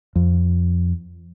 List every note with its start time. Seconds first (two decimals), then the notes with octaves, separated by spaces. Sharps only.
0.16 F2